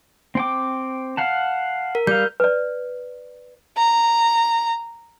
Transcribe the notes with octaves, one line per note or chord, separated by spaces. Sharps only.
C4 G5 D6
F5 F#5 A5
A#4
G3 F5 G6
B4 D5
A#5